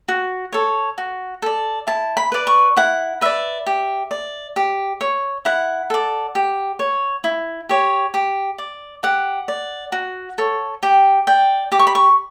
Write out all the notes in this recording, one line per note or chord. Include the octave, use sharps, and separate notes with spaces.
F#4
A4 C#5
F#4
A4 D5
E4 A5
B5
B4 D5
C#6
E4 F#5
B4 D5 E5
G4
D5
G4
C#5
E4 F#5
A4 D5
G4
C#5
E4
G4 C#5
G4
D5
G4 F#5
D5
F#4
A4 C#5
G4 G5
D5 G5
G4 D6
C#6
B5
C#6